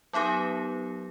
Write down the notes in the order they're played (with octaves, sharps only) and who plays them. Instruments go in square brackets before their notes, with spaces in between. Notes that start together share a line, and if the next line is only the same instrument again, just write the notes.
[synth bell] F#3 B3 D#4 G4 A#4